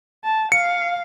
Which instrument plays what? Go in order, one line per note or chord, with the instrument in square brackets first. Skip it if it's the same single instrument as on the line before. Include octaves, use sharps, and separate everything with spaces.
[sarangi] A5
[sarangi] F5 [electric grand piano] C#7